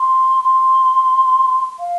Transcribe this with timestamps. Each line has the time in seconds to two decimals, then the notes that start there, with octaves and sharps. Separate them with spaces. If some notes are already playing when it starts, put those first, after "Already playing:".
Already playing: C6
0.44 C6
1.79 F5